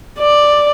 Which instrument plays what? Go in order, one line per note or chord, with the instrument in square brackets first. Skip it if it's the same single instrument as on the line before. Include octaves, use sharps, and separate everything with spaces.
[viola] D5